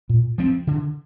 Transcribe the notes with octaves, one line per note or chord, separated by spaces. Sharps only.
A#2
F3 C4
D3